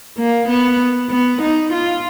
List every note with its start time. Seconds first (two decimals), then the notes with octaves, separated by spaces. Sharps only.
0.18 A#3
0.48 B3
1.10 B3
1.42 D#4
1.72 F4